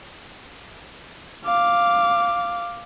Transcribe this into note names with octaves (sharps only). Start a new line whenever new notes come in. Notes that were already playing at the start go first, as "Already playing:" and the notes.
F5 D6